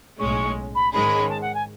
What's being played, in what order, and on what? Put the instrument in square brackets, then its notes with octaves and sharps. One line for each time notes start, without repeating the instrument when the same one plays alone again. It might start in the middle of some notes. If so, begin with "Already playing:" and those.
[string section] B1 A2 G#3 C#4 [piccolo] C#6
[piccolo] B5
[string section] G#2 D#3 G#3 C#4 G#4 [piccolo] B5
[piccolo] A5
F#5
G#5